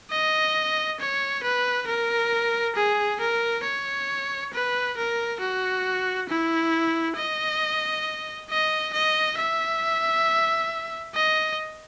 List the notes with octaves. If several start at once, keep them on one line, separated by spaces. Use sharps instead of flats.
D#5
C#5
B4
A#4
G#4
A#4
C#5
B4
A#4
F#4
E4
D#5
D#5
D#5
E5
D#5